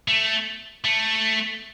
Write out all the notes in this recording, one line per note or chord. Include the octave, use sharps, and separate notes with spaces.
A3
A3